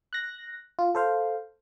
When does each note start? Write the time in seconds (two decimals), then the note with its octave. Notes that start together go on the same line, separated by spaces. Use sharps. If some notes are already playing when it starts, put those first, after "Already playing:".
0.13 F#6 A#6
0.79 F4
0.95 A4 C5 F5